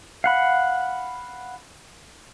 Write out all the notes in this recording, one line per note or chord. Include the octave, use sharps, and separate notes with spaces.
F5 F#5 B5